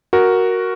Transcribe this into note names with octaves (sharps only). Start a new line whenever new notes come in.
F#4 A#4